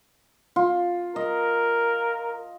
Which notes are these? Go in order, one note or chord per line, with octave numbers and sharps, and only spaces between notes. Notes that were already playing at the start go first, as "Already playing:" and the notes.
F4
A#4 D#5